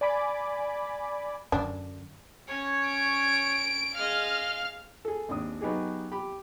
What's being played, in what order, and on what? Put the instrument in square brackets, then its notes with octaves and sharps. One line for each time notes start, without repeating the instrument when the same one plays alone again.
[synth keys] D5 G#5 B5 D6
[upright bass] F#2 D3 [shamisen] D4
[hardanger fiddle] C#4 C#5
[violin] D7
[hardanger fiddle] G#3 D#5 [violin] F5 F6
[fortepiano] G#4 A4
G#1 D#2 D4 D#6
F#3 B3 D#4 G4 G#4
G4 B5